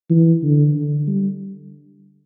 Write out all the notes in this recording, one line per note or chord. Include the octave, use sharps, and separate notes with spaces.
E3
D3
D3
G3